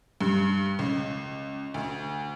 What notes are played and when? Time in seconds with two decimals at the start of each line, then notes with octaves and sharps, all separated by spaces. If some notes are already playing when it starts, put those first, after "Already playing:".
0.21 G2
0.79 C#2
1.74 D2